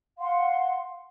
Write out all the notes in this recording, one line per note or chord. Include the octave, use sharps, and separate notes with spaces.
F5 F#5 C6